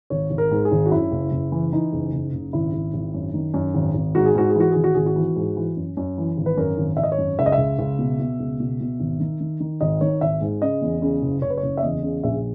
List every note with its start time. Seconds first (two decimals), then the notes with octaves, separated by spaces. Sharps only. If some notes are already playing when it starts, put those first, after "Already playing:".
0.10 G#1 C#5
0.30 G#1
0.38 A#4
0.51 G#2
0.65 G#4
0.72 G#1
0.86 F#4
0.91 F#2 E4
1.12 F#1
1.32 F#1
1.52 E3
1.72 E3 D#4
1.93 F#1
2.13 F#1
2.33 F#1
2.53 G#1 E4
2.73 G#1
2.94 G#1
3.14 F#2
3.34 D#3
3.54 F#2
3.74 G#1
3.94 G#1
4.15 G#2 F#4
4.26 G#4
4.35 G#2 F#4
4.49 G#4
4.55 E3 F#4
4.72 G#1 G#4
4.84 F#4
4.95 G#1 G#4
5.06 F#4
5.16 E3
5.36 G#2
5.57 E3
5.77 F#2
5.97 F#2
6.18 E3
6.37 G#1
6.46 B4
6.57 F#2 A#4
6.78 G#1
6.97 G#1 E5
7.03 D#5
7.12 C#5
7.18 F#2
7.39 C#2 E5
7.46 D#5
7.52 E5
7.58 C#2
7.79 C#2
7.99 B2
8.19 B2
8.40 C#2
8.60 B2
8.80 B2
9.00 G#1
9.20 D#3
9.40 D#3
9.60 D#3
9.81 G#1 D#5
10.01 D#3 C#5
10.21 G#1 E5
10.41 G#2
10.62 C#3 D#5
10.81 E2
11.02 C#3
11.22 F#1
11.42 F#1 C#5
11.50 B4
11.58 C#5
11.63 F#1
11.77 E5
11.82 E2 D#5
12.03 C#3
12.23 A#1 E5